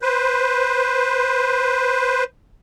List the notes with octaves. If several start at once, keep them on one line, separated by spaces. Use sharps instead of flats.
B4 C5